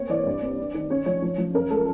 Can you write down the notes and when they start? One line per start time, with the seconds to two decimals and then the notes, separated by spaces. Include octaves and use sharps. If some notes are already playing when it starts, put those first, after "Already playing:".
Already playing: A#3 C4 C#5
0.09 E3 D5
0.26 G2
0.42 C4
0.58 D4
0.74 D#3
0.90 C#4 C#5
1.06 F3 C#5
1.22 F3
1.38 F3
1.54 F#2 A#4
1.70 G#3 A4